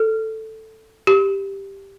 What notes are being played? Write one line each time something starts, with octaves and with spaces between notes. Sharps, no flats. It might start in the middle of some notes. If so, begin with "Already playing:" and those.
Already playing: A4
G4